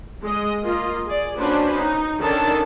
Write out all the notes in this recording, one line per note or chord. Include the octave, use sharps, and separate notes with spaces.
G#3 D#5
A#3 F4 D#5
G#4 D5
A#3 C#4 D4 F#4 B4 C5
D#4
D#3 C#4 D4 A4 A5